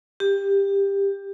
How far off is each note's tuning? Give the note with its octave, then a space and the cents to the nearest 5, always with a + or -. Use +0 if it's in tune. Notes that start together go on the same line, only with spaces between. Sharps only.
G4 +15